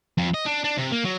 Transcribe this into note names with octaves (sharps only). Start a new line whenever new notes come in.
F2
D#5
D4
D4
C3
A#3
F#3